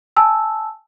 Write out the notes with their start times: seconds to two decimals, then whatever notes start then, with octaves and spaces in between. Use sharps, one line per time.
0.17 G#5 A5 E6